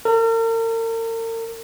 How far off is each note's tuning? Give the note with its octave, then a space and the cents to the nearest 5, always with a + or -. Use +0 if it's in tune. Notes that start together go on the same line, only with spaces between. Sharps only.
A#4 -40